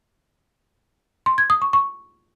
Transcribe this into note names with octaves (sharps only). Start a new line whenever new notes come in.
C6
G#6
D#6
C#6
C#6